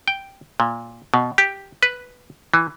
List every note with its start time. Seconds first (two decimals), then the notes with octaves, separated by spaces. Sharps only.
0.08 G5
0.60 A#2
1.14 B2
1.38 G4
1.83 B4
2.54 E3